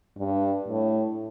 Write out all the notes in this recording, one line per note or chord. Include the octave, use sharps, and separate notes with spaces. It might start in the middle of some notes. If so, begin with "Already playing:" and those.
G2
A2